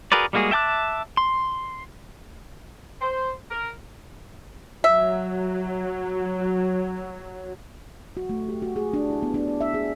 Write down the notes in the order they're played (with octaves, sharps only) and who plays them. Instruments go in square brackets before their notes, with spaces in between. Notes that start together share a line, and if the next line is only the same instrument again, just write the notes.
[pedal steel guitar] F#4 G#4 A#4 B4 D5
G3 G#3 A#3 F#4 G#4
E5 G5 A5 D6 F#6
C6
[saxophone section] C5
A#4
[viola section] F#3 [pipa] E5
[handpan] F#4
A3
G4
F#4
G#4
D4
E4
B3
D4
D5
E5
G#4